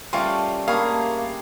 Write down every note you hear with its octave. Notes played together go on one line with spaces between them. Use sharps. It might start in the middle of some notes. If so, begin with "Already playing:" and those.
G3 A3 C#4 F4 A#4 F5 C6 C#6
G3 A#3 D4 G#4 F5 B5 C#6